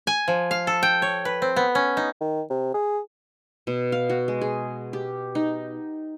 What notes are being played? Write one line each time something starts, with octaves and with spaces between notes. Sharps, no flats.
G#5
F3
F5
A4
G5
C#5
B4
C4
B3
C#4
D#4
D#3
C3
G#4
B2
F5
F#4
G#3
G#4
G4
D#4